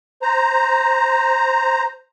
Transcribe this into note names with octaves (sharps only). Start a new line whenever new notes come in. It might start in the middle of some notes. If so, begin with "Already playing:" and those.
C5 A#5